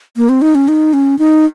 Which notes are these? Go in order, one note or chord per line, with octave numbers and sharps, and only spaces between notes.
A#3
C4
D#4
C#4
D#4
C#4
D#4